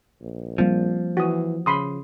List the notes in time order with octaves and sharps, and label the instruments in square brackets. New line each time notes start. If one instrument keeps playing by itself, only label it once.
[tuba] A#1
[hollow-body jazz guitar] F3 [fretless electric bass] G3 A#3 C4
[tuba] E3 [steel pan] F#4 D#6
[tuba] C#3 [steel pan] B5 C6 D#6